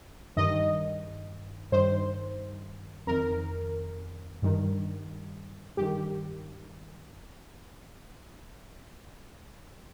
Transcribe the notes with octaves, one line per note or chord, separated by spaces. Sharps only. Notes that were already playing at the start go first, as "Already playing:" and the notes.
G2 D#3 D#5
G2 D#3 C5
F2 D#3 A#4
G2 D#3
G2 D#3 G4